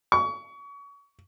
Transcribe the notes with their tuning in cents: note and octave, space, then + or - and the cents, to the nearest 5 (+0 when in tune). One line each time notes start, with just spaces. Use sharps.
C#6 +30